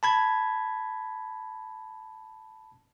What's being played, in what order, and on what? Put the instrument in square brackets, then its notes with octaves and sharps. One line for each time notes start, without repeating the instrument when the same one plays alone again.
[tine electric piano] A5 B5 G#6